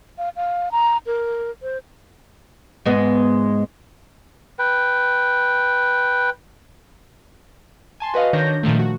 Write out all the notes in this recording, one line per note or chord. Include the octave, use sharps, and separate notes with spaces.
F5
F5
A#5
A#4
C5
G#2 G#3 B3
B4 G5
G#5 A5 C6
F#4 B4 D#5 F5
D#3 D4 C#5 G6 A#6
A#2 D#3 F3 A3
F#4